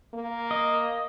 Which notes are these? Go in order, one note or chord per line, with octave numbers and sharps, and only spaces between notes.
A#3
D#5